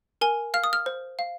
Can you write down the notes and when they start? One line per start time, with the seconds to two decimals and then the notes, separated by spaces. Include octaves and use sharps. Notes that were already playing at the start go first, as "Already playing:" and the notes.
0.21 A#4 G#5
0.54 F5 F6
0.64 D#6
0.73 F6
0.86 C5
1.19 F5